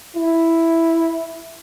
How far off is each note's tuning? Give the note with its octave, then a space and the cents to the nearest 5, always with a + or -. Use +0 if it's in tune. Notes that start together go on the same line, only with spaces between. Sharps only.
E4 +0